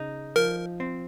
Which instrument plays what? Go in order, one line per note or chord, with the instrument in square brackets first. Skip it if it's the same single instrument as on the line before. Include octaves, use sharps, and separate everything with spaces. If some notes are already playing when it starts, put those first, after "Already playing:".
Already playing: [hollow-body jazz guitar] C#3 D#4
[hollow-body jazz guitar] F3 [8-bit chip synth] A#4
[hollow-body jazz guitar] C4